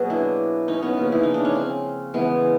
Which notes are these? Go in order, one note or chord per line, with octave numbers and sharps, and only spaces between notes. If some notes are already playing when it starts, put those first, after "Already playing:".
Already playing: B2 F#3 A#3 F#4 G#4
D4 E4
C#4 D#4
B3 C#4
C#3 F3 A#3
E4
D#4
D4
C#4
C4
C#3 E3 G#3 B3